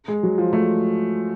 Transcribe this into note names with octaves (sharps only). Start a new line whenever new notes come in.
G#3
F#3
F3
A3